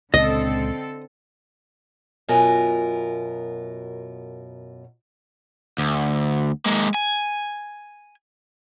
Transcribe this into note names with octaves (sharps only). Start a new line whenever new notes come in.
C#2 A#2 D3 C4 A4 D#5
F#2 B2 F4 A#4 G#5
D2
G#3 A#3
G#5